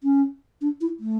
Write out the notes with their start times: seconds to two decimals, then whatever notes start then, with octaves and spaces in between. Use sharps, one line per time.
0.03 C#4
0.61 D4
0.81 E4
1.00 A3